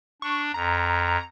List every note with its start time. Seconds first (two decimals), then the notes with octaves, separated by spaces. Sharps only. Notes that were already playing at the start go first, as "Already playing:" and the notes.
0.22 D4 C#6
0.54 F2 A#5